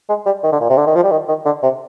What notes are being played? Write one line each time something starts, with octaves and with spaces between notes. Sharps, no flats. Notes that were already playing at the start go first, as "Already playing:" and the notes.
G#3
G3
D#3
D3
A#2
C3
D3
D#3
F3
G3
D#3
D#3
D3
C3